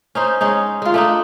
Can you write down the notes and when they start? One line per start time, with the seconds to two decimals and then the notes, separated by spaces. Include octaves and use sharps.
0.15 C#4 D#4 C5
0.41 G#3 C#4 D#4
0.82 G#3 F4
0.94 A3 D4 D#4